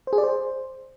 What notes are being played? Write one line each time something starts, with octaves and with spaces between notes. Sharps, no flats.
C5
G#4
D5
C5